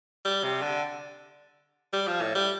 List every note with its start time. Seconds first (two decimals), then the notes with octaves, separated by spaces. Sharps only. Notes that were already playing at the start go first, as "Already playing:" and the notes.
0.25 G3
0.44 C3
0.62 D3
1.93 G3
2.08 F3
2.21 A2
2.35 G3